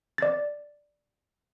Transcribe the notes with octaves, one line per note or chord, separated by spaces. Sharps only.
D5 A6